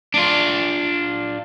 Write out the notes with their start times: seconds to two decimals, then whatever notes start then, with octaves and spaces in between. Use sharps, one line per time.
0.14 D4 F4